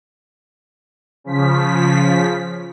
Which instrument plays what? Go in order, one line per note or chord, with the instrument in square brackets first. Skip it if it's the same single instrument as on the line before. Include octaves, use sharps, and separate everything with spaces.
[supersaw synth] C#3 F3 B6